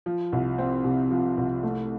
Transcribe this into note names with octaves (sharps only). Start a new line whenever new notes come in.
F3
C2
C4
C3
F3
C2
A3